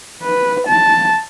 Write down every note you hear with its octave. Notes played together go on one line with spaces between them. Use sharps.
B4
A5